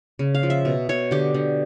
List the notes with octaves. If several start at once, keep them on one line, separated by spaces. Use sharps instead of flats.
C#3
F5
F3
E5
B2
B2 C#5
D3 G4
D3